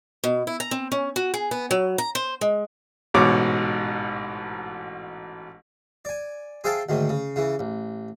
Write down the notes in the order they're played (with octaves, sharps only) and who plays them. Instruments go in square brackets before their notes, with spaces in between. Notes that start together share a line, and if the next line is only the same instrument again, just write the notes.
[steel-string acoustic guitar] B2
E4
A#5
C4
C#4
F#4
G#4
B3
F#3
A#5
C5
G#3
[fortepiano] A1 G#2 B2 C#5 D6
[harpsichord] D5 G#5
G#4 C5 E5 F5 G5 A5
D2 G#2 D#3
C#3
C#3 E3
A1